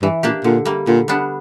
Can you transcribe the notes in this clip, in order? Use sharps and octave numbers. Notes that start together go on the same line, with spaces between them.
G2 E3
A#2 A#3 D4 G4
A#2 D3
G3 A#3
A#2 D3
G3 B3 D4